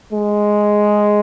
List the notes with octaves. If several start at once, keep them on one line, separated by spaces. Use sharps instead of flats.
G#3